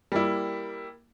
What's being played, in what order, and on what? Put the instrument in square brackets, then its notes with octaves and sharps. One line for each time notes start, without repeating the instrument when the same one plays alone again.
[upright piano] G3 A#3 E4